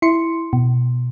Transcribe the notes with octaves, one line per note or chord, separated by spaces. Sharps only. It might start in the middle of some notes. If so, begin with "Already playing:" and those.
E4 C6 C#7
B2